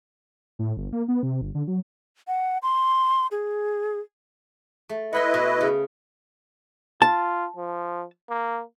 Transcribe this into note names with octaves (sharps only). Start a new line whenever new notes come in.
A2
G1
A#3
B3
C3
G1
D3
F#3
F#5
C6
G#4
A3
E4 B4 D#5 F#5 B5 C6
B2
C#3
F4 A5
F3
A#3